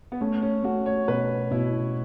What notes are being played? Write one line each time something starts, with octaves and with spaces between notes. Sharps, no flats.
B3
A3 C#4
C#4
A3 F#4
C#5
B2 B4
B2 E4